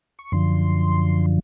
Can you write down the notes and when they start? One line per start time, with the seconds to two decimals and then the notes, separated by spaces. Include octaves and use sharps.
0.19 C#6
0.32 F#2 D3 F3 C6